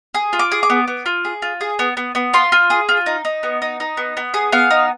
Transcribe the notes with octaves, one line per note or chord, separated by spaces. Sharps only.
G#4
F4
D6
G#4
D6
B3
B3
F4
G#4
F4
G#4
B3
B3
B3
F4 C6
F4
G#4
F4
D#4
D#4
B3
D#4
D#4
B3
B3
G#4
B3 F5
D#4